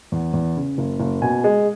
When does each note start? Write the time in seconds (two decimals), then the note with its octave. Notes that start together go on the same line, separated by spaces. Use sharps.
0.12 E2
0.34 E2
0.56 C#3
0.78 F#1
1.00 F#1
1.22 B2 G#5
1.44 G#3